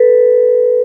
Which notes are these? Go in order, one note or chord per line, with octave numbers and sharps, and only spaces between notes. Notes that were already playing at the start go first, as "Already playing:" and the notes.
Already playing: A4 B4